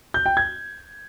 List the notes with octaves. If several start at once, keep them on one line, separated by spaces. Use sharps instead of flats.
G6
G5
G#6